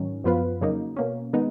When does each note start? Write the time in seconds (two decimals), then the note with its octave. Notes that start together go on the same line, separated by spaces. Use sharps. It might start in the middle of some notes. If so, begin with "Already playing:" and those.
Already playing: G#2 D#3 F#3 C#4
0.24 F#2 F3 B3 F4 B4
0.61 F2 C#3 F#3 A#3 D#4
0.96 B2 A#3 C#4
1.33 D#3 G#3 B3 D#4